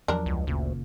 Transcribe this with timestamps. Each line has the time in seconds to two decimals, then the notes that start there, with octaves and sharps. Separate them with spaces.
0.08 E2 F3 F#3 D4 A#4
0.26 C#2
0.47 F#1 D2 A#2 C#3